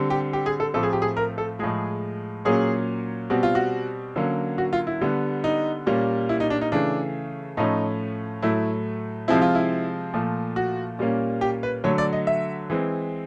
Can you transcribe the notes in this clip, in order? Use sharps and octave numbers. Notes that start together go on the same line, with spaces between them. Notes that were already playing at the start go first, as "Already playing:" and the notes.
Already playing: D3 G3 C4
G4
G4
G#4
A4
A2 F3 A3 C4 A4
G#4
G4
G#4
A#4
A4
A2 F3 G#3 G#4
A#2 F#3 A#3 C#4 G#4
B2 G3 C4 F#4
F4
F#4
D3 F#3 A#3 C#4
F#4
F4
E4
D3 G3 B3
D#4
A#2 G3 A#3 C#4
E4
D#4
D4
D#4
C#3 E3 A3 D4
A2 F3 A3 C#4 D#4
A2 F#3 A3 E4
C3 F3 G#3 C4 E4
F4
E4
A#2 F3 A3
F#4
A#2 G3 A#3 C#4
G4
B4
D3 F#3 A3 C#5
D5
D#5
E5
E3 G#3 C4